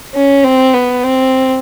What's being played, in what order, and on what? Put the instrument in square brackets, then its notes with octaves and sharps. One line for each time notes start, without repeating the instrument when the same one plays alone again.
[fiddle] C#4
C4
B3
C4